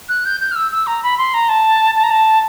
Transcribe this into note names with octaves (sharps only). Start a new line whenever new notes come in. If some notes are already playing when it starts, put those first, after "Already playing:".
F#6
G6
G6
F6
E6
E6
A#5
B5
C6
A#5
A5
A5
A#5
A5